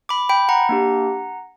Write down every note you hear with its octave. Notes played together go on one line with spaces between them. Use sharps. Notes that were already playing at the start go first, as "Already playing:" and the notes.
B5 D6
G5 B5
F#5 A#5
A#3 D4 G4